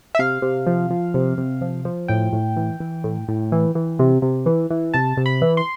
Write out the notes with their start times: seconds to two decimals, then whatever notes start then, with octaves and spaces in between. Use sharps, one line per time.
0.15 E5
0.19 C3 F5
0.42 C3
0.67 F3
0.90 F3
1.14 C3
1.38 C3
1.61 F3
1.85 F3
2.08 A2 G5
2.33 A2
2.57 E3
2.80 E3
3.04 A2
3.28 A2
3.52 E3
3.75 E3
3.99 C3
4.22 C3
4.46 E3
4.70 E3
4.94 C3 A5
5.17 C3
5.26 B5
5.42 E3
5.57 C6